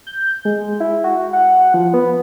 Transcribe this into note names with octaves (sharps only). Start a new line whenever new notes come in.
G6
G#3
E4
F#4
F#5
F3
B3